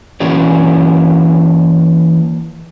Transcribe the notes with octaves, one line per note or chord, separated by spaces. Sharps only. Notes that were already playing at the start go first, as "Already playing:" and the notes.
E3 A#3 C#4 F#4 C#5 D5